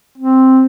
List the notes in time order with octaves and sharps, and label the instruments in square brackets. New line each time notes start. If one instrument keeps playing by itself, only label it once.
[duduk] C4